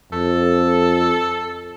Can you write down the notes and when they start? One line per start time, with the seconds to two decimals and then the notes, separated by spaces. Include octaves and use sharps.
0.13 F2 A4